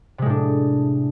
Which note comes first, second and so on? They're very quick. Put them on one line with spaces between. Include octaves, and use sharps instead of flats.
C3 G#3 A2 D4